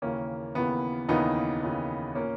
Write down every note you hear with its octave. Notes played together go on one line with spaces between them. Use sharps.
D#2 C#3 E3 A#3 C#4
D#2 C#3 E3 B3
D#2 C#3 E3 B3 D#4
D#2 C#3 E3
A#2 A#3 C#4